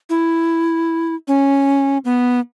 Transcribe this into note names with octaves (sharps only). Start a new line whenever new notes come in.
E4
C#4
B3